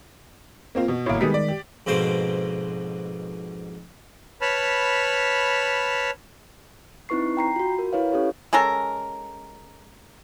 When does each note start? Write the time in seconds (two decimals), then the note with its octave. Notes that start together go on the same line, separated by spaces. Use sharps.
0.75 A#3 C4 F4
0.88 B2
1.06 G1 A2 A#3 C#5
1.21 D#3 G3 G#3 B3 G#4 B6
1.34 D5
1.49 G4
1.86 F2 G#2 B2 C5 D5
4.41 B4 C#5 A5 B5 F6
7.09 C4 D#4 E4 B4 C#6 C7
7.37 G5 A#5 C7
7.56 F4 F#4
7.79 A#4
7.93 E4 B4 C#5 F5
8.12 C#4 E4 G4 A4 C#5
8.53 G#3 C#4 A4 A#4